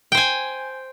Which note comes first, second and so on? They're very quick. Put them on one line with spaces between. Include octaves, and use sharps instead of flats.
G5 C5 G#5